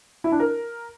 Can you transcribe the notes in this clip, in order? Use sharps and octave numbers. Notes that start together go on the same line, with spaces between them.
E4
D4
A#4